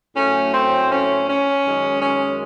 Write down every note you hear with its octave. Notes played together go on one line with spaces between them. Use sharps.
A2 F#3 A3 C#4
C4
C#4
C#4
F#2 D#3 G#3
C#4